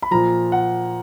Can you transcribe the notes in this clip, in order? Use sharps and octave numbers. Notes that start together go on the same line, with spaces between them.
B5
A#2 F3 A#5
F#5